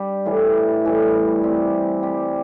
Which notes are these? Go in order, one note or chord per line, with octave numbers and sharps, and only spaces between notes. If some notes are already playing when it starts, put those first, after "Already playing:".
Already playing: G3 D4 G4
A2 E3 G3
A2 E3 G3
G3 C4 G4
G3 C4 G4